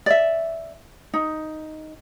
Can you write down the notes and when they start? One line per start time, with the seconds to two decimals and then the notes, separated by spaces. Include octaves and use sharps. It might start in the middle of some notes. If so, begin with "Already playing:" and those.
0.06 D5 E5
1.14 D#4